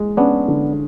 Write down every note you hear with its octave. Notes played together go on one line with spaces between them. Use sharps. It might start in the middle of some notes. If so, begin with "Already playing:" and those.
Already playing: G#3
B3 C#4 D4
D3